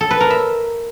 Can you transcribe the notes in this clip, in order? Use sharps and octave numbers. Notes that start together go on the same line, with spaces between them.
A4
B4
A#4
E5